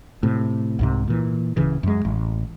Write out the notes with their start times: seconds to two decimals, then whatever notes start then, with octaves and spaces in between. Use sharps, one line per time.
0.23 A2 C3
0.79 C2 G#2 C3
1.08 A#2 E3
1.57 D1 C#3 E3
1.83 F#2 G#3
2.05 A1